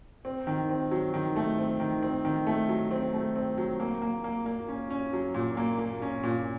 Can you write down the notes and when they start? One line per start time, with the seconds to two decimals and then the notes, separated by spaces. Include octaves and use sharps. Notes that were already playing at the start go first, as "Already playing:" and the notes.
0.25 C4
0.47 D#3
0.69 C4
0.91 F#3
1.14 D#3
1.36 A3
1.58 C4
1.80 D#3
2.03 C4
2.25 D#3
2.47 A3
2.69 F#3
2.91 C4
3.13 A3
3.36 C4
3.58 F#3
3.80 A#3
4.02 A#3
4.24 A#3
4.46 A#3
4.68 C#4
4.90 C#4
5.13 F#3
5.34 A#2
5.57 A#3
5.79 A#3
6.02 C#4
6.23 A#2